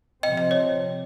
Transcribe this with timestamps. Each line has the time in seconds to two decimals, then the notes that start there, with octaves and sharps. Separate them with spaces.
0.23 C3 F3 C4 D#5 G5
0.37 D#5
0.51 C#5